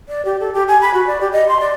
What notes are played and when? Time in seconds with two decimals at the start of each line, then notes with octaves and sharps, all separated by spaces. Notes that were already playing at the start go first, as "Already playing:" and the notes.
0.09 D5
0.25 G4
0.40 A4
0.54 G4
0.68 G#5
0.81 B5
0.94 F#4
1.07 D5
1.21 G4
1.32 D#5
1.49 C6
1.60 D5